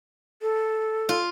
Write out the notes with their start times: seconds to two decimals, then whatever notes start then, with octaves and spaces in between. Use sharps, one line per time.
0.42 A4
1.09 F4